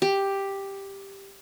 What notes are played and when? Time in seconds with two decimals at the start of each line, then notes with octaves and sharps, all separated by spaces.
0.02 G4